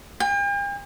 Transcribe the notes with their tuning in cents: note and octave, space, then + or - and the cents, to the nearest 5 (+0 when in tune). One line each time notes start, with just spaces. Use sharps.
G5 +45